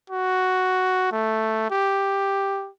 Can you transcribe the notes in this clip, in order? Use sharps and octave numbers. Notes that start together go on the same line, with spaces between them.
F#4
A3
G4